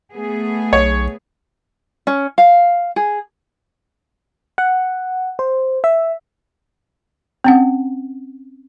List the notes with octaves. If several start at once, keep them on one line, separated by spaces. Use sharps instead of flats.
A3 B3 G#4
B1 C#5
C#4
F5
G#4
F#5
C5
E5
C4 C#4 F#5